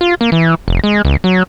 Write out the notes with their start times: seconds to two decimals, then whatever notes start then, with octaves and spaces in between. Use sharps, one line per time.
0.01 F4
0.21 A#3
0.32 E3
0.68 F1
0.84 G#3
1.05 C#2
1.24 F#3